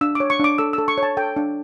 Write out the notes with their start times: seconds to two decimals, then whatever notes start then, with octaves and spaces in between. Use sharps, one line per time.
0.01 D4 E6
0.15 C#5 D6
0.30 C#6
0.40 D4 D6
0.58 A4 E6
0.73 A4 E6
0.88 C#6
0.98 C#5 A5
1.17 A4 G5
1.36 D4